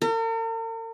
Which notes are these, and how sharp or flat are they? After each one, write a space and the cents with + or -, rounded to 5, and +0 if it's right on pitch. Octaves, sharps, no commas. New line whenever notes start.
A#4 -45